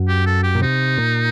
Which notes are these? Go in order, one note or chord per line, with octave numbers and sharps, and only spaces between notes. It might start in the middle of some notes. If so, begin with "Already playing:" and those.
Already playing: F#2
G4
A4
G4
A#2
C3 D#4
A#2